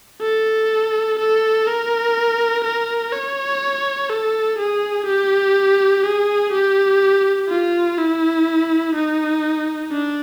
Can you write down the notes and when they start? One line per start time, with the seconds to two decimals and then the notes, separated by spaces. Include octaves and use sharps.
0.21 A4
1.18 A4
1.67 A#4
2.64 A#4
3.12 C#5
4.09 A4
4.58 G#4
5.06 G4
6.04 G#4
6.52 G4
7.49 F4
7.98 E4
8.95 D#4
9.92 D4